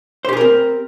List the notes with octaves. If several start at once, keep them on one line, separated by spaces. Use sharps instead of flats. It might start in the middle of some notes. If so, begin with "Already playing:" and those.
C4 G4 G#4 A#4 C5